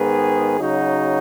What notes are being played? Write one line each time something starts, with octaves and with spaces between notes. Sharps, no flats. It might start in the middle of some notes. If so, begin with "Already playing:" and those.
Already playing: G#2 D#3 B3 G#4
C#3 F#3 D#4 F#4